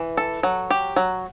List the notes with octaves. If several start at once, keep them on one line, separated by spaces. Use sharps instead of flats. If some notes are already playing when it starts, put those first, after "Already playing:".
Already playing: E3
A4
F#3
G4
F#3